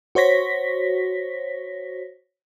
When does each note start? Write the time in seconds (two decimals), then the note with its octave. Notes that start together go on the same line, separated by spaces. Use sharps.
0.15 F#4 C5 C#5 A#6 B6